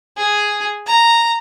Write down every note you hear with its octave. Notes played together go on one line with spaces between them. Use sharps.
G#4
A#5